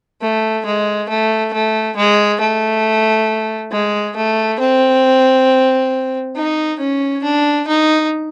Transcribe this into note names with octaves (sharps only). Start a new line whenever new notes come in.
A3
G#3
A3
A3
G#3
A3
G#3
A3
C4
D#4
C#4
D4
D#4